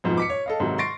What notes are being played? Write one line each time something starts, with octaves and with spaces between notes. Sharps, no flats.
F2 G#2 B2 F3
D6 B6 C#7
C#5
A4 D#5 F5
G#2 C3 D#3 F#3
C6 C#6 A6 A#6 C7 D7